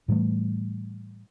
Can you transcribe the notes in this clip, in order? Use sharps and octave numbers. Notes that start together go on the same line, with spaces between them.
A2 E3 G3 A3